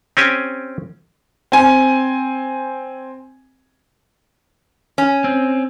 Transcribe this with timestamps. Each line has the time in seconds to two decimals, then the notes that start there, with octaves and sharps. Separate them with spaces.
0.17 C4 C#4 G4 G#5
1.52 C4 G#5
4.98 C#4
5.24 C4